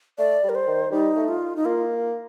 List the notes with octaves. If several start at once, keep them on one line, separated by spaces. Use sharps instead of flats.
A3 D5
G3
A#4
C5
D#3
G3 D#4
A3
F4
D#4
A#3 F4